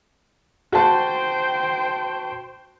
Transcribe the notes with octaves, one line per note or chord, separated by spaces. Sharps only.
F#4 C5 G5 A5